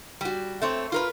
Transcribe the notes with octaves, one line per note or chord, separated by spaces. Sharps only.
G3 F#4
A3 C4 C#5
F4 A#4 B4